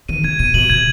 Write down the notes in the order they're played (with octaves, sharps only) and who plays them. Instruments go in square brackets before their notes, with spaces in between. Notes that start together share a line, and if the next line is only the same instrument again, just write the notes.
[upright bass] D#3 [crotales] D#7
[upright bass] C#3 [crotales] G#6
[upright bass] B2 [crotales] D#7
[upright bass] B2 [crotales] F#7
[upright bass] C#3 [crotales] G#6